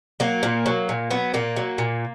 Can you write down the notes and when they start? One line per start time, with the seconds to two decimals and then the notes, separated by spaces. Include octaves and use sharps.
0.20 F#3 A#3
0.43 A#2
0.66 F#3
0.89 A#2
1.11 F#3 B3
1.34 A#2 A#3
1.56 F#3
1.78 A#2